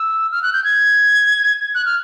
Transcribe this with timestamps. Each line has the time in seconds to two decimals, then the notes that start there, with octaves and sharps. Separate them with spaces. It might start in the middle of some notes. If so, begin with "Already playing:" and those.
Already playing: E6
0.32 F6
0.43 F#6
0.53 G6
0.64 G#6
1.75 F#6
1.86 F6